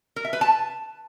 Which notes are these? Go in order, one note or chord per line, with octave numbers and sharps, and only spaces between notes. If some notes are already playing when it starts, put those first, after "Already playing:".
A#4
E5
B4
A5